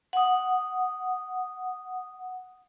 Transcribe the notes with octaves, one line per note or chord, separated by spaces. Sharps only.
F#5 D#6